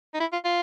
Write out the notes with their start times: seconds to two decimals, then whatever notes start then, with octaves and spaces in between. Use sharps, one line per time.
0.14 D#4
0.20 E4
0.32 F4
0.44 F4